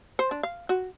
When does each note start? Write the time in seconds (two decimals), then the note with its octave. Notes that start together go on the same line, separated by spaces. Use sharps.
0.19 C5
0.31 D4
0.43 F5
0.69 F#4